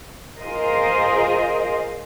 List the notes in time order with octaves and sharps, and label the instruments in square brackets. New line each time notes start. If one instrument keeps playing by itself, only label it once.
[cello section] F4 G#4 A#4 C5 D#5